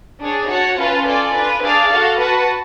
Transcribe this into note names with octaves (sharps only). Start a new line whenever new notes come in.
D4 G#4 C#5
F#4 C#5 F#5 A5
C#4 F4 B4 F5 A5
F4 A4 D5 G#5
D4 F4 B4
D4 G#4 D5 F5 A5
F#4 A4 F5 A5
F#4 B4 F#5 A5